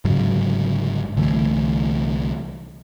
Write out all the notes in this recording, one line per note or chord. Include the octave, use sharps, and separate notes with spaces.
G1 G#2 C#3 F#3
C2 D3 E3 A3